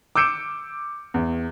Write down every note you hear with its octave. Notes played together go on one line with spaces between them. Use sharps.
D6 E6 G6 C#7 D7 E7
E2